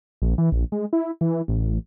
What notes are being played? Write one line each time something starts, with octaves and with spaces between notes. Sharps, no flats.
A#1
E3
A#1
G#3
E4
E3
A1